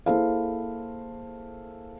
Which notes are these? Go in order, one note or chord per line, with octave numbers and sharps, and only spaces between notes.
A#3 E4 G#4 A4 C5 F5